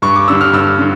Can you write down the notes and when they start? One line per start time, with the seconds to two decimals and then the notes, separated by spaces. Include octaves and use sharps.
0.02 G2 C#6
0.15 D6
0.28 D3 G3 E6
0.41 F6
0.53 G2 E6
0.79 D3